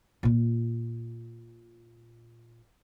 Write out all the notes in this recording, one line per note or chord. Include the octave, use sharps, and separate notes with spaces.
A#2 F4